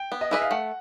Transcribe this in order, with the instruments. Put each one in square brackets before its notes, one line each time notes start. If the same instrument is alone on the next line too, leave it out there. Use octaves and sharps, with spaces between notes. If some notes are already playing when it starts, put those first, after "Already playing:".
Already playing: [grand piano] G5
[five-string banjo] B3
[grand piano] D#5
[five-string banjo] E4 G#4 B4 D#5 [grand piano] E5
[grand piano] F5
[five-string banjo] A3 [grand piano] F#5